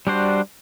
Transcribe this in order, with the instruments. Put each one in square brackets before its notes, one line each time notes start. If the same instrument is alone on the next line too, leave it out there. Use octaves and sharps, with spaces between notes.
[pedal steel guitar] G3 D4 F#4 C5